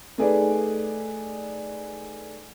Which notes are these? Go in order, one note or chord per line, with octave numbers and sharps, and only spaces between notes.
A3 D#4 G#4 B4 D5